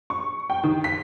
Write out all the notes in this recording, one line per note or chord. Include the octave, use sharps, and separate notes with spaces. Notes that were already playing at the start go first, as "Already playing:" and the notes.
C#6
G5
D#3
B6